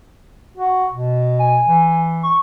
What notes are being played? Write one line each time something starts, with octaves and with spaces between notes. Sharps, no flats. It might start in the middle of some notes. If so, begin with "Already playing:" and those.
F#4
B2
G#5
E3
C#6